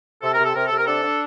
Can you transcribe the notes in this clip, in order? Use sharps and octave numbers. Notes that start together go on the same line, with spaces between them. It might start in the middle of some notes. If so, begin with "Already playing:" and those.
C3 A4
A#4
C3
A4
C3 A#4
A4
C3
A#4
D4 A4
D4